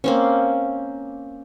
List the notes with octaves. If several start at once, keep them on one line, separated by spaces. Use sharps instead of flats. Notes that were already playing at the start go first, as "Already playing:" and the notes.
A#3 C4 C#4